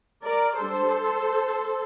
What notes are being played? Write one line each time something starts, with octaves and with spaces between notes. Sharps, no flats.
A#4 D5
G3 D4 A4 C5